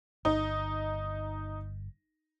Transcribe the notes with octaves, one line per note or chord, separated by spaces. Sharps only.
G1 D#4